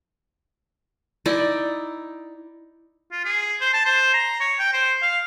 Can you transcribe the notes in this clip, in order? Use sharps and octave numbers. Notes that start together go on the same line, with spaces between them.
D#4 E4 D5
F4
G#4
C5
A5
C5
A#5
C#5
G5
C5
F5